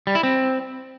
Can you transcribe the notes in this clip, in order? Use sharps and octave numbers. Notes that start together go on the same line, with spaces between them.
G3
E4
C4